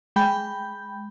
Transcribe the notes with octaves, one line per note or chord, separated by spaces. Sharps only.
G#3 G5 B5 G6